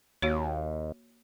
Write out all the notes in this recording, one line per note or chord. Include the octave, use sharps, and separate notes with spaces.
D#2 A#3 F#4 C#5